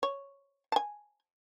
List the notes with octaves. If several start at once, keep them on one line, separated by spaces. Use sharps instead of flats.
C#5
G#5 A5